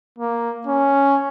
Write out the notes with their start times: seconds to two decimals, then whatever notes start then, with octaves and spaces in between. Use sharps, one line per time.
0.18 A#3
0.67 C#4